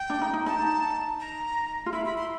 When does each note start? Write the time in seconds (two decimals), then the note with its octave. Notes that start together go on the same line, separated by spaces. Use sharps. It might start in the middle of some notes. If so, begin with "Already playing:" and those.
Already playing: G5
0.10 D4
0.22 D#4
0.34 D#4
0.46 D#4 A5
1.20 A#5
1.86 F4
1.93 E4 B5
2.05 B5
2.18 C6